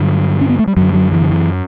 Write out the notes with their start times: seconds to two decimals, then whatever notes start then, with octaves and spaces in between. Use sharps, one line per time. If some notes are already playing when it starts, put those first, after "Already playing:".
Already playing: G2 D3 F#3
0.41 C#4
0.49 B3
0.59 A3
0.67 G3
0.77 F#2 D3 F#3
0.94 F#3
1.12 E3
1.21 D3
1.30 E3